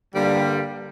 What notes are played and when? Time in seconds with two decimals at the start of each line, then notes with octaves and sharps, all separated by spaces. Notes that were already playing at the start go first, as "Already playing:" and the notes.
0.12 G2 D3 G3 A#3